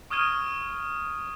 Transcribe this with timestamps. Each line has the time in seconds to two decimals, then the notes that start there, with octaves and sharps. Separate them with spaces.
0.10 C#6 D#6 F6 G#6 D#7 G7